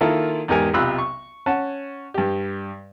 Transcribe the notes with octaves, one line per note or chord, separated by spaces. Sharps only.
D#3 A#3 E4 F4 A4
E2 G#2 D#4 G4 A#4 G#5
B1 C3 F4 B5 E6 F#6
C#6
C#4 F#5 A5
G2 G4